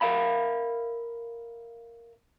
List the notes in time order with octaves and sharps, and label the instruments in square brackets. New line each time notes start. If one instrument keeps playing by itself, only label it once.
[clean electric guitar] A#4 E5 F5 B5